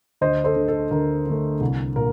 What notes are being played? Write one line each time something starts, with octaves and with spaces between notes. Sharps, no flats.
D2 C5 D#5
A4 C5
D3 A3
A4
D2 A#4
D3 A3
C2
A#2 A#4